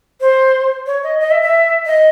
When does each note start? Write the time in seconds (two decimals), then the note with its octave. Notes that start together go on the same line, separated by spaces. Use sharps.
0.21 C5
0.87 C#5
1.03 D#5
1.20 D#5
1.31 E5
1.42 E5
1.86 D#5